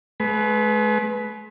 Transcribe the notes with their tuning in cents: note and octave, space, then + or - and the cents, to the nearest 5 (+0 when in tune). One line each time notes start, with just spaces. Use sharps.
G#3 +40 B4 +0